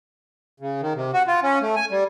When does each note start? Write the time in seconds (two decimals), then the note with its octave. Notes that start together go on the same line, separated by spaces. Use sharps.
0.60 C#3
0.81 D#3
0.95 C3
1.13 F#4
1.28 F4
1.43 C#4
1.62 A3
1.76 G#5
1.91 G3